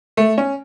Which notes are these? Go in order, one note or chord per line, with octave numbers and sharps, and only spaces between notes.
A3
C#4